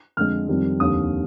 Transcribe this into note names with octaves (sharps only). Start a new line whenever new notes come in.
F2 D3 G#3 F6
F2 D#3 G3
F1 D#2 D3 D#6